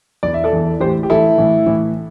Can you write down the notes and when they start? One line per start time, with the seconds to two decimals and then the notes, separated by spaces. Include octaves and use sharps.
0.23 E2 E3 D5
0.34 E5
0.44 A4 D5
0.53 E2 E3
0.80 A2 E3 G4 C5
1.03 G4
1.10 A2 E3 E4 A4
1.38 A2 E3
1.66 A2 E3